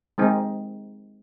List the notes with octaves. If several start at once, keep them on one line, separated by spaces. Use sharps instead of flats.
G#3 C4 D#4